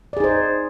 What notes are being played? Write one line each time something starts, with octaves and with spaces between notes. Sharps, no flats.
D#4 G#4 C5 D5